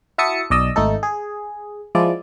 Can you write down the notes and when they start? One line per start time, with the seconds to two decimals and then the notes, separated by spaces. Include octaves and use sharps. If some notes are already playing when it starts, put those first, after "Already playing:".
0.18 E4 F#4 E5 A5 D#6 C#7
0.50 B1 D5 D#5 E6
0.76 G#1 A3 D#4 A4
1.03 G#4
1.95 F3 G#3 E4 D5